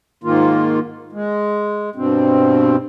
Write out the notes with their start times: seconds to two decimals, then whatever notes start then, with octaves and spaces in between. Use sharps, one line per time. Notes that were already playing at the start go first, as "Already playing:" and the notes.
0.24 G#2 D#3 A#3 F4
1.12 G#3
1.95 G2 B2 C4